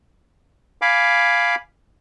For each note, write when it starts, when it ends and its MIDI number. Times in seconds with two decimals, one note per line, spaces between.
0.82 1.55 77
0.82 1.55 80
0.82 1.55 83
0.82 1.55 86